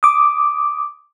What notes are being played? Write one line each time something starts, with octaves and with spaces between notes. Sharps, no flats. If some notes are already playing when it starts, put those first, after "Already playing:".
D6 D#6